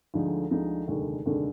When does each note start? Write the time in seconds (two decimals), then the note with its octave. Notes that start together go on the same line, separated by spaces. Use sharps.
0.14 D2 D3 F3 G#3 D#4
0.51 D2 D3 F3 G#3 D#4
0.88 F1 D#2 D3 G#3
1.25 F1 D#2 D3 G#3